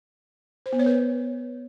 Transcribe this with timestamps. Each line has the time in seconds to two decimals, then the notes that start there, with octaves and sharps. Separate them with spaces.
0.66 C5
0.73 B3
0.79 C#5
0.86 B4